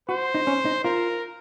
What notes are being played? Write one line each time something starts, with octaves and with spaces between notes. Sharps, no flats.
F#4 C5
D#4
C#4
D#4
F4 A#4